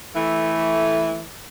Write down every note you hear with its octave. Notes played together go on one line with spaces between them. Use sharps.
E3 A3